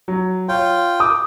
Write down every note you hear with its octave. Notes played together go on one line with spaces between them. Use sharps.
F#3
F4 C#5 G5
D6 D#6